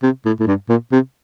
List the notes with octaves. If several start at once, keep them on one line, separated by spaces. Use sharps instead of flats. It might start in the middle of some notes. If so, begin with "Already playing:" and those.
C3
A2
A2
G2
A#2
C3